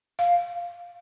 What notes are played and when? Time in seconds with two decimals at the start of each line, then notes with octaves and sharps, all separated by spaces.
0.19 F5